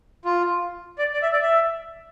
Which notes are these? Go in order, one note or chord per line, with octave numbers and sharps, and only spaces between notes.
F4
D5
D5
E5
D5
E5